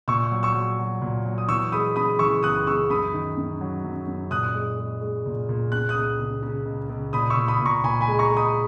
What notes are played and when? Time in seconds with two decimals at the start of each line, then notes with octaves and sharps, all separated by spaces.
0.08 A#2 C#6 E6
0.32 F#3
0.43 C#6 E6
0.55 F#3
0.79 F#3
1.02 A#2
1.26 F#3
1.38 D#6
1.49 E3 C#6 E6
1.72 G#3 B5 D#6
1.96 C#3 B5 D#6
2.19 E3 C#6 E6
2.43 C#2 D#6 F#6
2.67 C#3 C#6 E6
2.90 F#2 B5 D#6
3.13 D#3
3.37 F#2
3.61 F#3
3.84 F#2
4.07 F#2
4.31 A#2 D#6 F#6
4.54 G#3
4.78 G#3
5.01 G#3
5.26 A#2
5.49 A#2
5.72 C#3 F#6
5.89 D#6 F#6
5.96 C#2
6.20 C#3
6.43 C#3
6.66 C#2
6.90 C#2
7.13 A#2 B5 D#6
7.30 C#6 E6
7.37 A#2
7.48 B5 D#6
7.60 A#2
7.66 A#5 C#6
7.84 A#2 G#5 B5
8.01 G#5 B5
8.08 G#3
8.19 A#5 C#6
8.31 G#3
8.37 B5 D#6